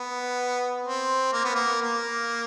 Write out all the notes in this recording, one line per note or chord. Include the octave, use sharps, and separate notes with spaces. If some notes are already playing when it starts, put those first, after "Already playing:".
Already playing: B3
C4
A#3
B3
A#3
A#3